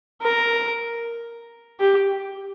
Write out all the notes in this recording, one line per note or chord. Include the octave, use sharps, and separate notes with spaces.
A#4
G4